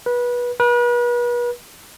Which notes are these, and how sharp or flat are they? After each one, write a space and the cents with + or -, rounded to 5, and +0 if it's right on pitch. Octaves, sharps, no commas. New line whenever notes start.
B4 -25
B4 -40